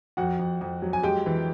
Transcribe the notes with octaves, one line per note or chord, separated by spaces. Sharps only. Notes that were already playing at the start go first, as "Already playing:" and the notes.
F2 F#4 F#5
F2
F2
F#3
G#5
G#3 G4 G5
E3